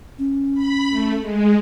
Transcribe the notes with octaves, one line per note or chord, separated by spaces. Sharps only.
C#4
B5
A3
G#3